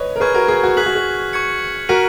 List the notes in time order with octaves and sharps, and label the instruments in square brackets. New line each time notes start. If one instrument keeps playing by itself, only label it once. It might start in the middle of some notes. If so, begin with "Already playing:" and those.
Already playing: [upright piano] B4 C#5 D#5
A#4
[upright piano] G#4 B4 [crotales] C#6 F6 G#6
[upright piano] F#4 A#4
G#4
F#4
[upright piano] G#4 [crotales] F#6 B6 F#7
[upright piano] F#4
G#4
[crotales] C#6 G#6 C#7
[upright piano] F#4 A#4 [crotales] F6 B6 D#7 F#7